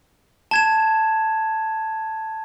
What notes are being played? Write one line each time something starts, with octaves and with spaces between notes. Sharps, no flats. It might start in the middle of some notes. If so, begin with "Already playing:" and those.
A5 G#6 E7